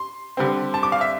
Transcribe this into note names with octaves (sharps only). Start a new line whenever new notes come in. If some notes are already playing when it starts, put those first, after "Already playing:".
Already playing: C6
D3 G3 C4
A5
D6
F5
E5